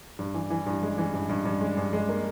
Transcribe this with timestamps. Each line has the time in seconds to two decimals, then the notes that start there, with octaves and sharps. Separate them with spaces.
0.19 G2
0.34 E3
0.50 E3
0.66 G2
0.82 G#3
0.98 E3
1.13 G2
1.29 G2
1.45 G2
1.61 G#3
1.77 G2
1.93 G#3
2.09 A#3